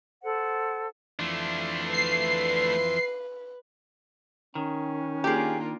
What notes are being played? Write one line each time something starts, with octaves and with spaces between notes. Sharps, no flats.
A4 C5 F#5
F2 E3 A3 D4 C6
B4 C7
D#3 C#4
A#3 D4 F4 G4 G#4